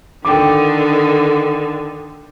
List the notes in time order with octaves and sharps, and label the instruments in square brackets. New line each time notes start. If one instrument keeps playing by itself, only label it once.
[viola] D3 D#3 [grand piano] G5 D6